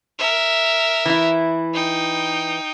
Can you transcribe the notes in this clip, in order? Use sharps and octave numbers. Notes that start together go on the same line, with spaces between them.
A#4 E5
E3 E4
D#4 G5